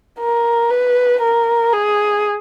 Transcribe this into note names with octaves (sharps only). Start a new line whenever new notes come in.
A#4
B4
A#4
G#4